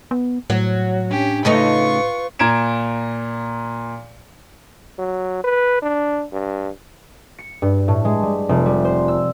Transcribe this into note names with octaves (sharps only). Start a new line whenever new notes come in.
B3
A2 F#3
C#4 D4 G4
C#3 A3 D#4 F4 B4 C#6
A#2 A#5 G#6 D7 E7
F#3
B4
D4
G2
C#7
G2
A2
G#3
G3
F1
G3
C5
E6